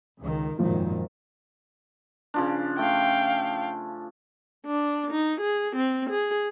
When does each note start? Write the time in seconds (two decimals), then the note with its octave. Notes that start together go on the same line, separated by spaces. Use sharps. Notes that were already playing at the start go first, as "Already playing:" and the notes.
0.20 C#2 D#3
0.59 G#1 F#2 A#2 D#3 F3
2.34 C#3 F3 D4
2.78 A3 F5 G5
4.66 D4
5.11 D#4
5.41 G#4
5.76 C4
6.10 G#4